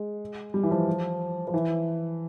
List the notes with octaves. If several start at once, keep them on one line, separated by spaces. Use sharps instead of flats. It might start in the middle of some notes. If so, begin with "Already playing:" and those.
Already playing: G#3
G3
E3
F3
F3
E3